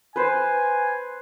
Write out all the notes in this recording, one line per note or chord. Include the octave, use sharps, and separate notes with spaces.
B4 C5 G#5